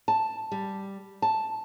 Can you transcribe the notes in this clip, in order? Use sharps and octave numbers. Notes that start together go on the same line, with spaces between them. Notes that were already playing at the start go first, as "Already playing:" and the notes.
A5
G3
A5